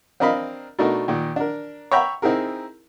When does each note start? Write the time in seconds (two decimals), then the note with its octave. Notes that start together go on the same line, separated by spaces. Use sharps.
0.20 C4 D4 A#4 D#5 F5 B5
0.79 B2 A3 D4 D#4 A#4
1.08 A#2 D#3
1.36 D4 A#4
1.92 C#5 E5 G5 A#5 B5
2.22 C4 D#4 E4 G#4 A#4